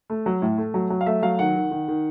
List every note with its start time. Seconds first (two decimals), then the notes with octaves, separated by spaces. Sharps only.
0.10 A3
0.26 F#3
0.42 A2
0.58 A3
0.74 F#3
0.90 F#3
1.01 F5
1.06 A3 E5
1.22 F#3 F5
1.39 D#3 F#5
1.56 D#3
1.71 D#3
1.88 D#3